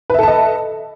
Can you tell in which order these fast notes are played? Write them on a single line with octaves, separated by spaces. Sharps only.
B4 E5 A4 A5 D#5